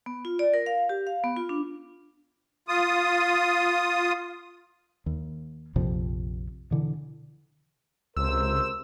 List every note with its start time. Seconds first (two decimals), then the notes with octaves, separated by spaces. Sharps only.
0.06 B3
0.25 F4
0.39 D5
0.54 A#4
0.66 F5
0.89 G4
1.07 F5
1.24 B3
1.36 F4
1.49 D4
2.68 F4 D#6
5.06 D#2
5.76 A#1 F2 C3 F3
6.71 B2 D3 E3
8.16 C#2 C3 A#4 C5 E6